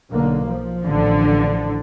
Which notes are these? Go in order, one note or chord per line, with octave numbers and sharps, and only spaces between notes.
B1 D3 A#3
F3
A1 D3